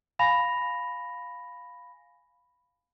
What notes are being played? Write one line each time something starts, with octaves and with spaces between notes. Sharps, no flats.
F5 G#5 B5 A#6 F7